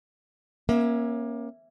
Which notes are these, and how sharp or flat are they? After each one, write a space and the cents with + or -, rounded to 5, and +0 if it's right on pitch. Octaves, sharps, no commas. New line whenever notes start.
A#3 +25 C#4 -15 E5 +0